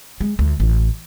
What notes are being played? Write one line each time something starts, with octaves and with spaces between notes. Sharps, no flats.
G#3
D2
A1